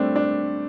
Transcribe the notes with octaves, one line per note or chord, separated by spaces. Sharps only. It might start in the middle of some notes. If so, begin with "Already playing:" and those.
Already playing: G3 A3 C4 D4
D4